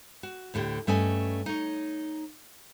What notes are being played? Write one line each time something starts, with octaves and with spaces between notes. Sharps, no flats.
F#4
D2 A2 D3 G4
G2 A3 C#4 D#5 G#5
D#4 C#5